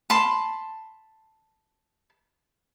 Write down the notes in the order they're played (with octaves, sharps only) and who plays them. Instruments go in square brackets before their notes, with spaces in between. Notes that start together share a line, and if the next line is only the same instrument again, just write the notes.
[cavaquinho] A5 B5 C6